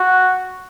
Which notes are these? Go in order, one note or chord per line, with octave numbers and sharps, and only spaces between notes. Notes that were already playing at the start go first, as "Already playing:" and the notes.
Already playing: F#4